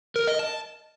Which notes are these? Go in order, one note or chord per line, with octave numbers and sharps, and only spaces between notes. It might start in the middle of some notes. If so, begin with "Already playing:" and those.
A#4
D#5
A5